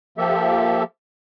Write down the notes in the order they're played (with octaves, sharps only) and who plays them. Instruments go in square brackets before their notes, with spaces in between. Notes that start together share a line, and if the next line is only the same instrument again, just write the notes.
[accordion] F3 A#3 G4 A4 E5